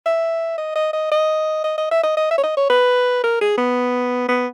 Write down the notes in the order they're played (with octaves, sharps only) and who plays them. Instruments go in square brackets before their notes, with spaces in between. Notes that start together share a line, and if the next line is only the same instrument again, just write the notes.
[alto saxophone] E5
D#5
D#5
D#5
D#5
D#5
D#5
E5
D#5
D#5
E5
C#5
D#5
C#5
B4
A#4
G#4
B3
B3